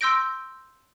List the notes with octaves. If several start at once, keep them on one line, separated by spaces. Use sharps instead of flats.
C6 E6 G6 A#6 D7